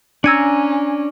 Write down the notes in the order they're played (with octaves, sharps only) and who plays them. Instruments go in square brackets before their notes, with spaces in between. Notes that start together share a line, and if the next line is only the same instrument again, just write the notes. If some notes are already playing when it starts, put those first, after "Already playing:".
[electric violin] C#4 [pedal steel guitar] D4 G#5 A#5 [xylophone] E6 G#6 C#7